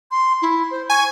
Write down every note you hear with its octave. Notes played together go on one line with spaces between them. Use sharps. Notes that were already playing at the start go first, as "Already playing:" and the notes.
C6
E4
C5
G#5 C#6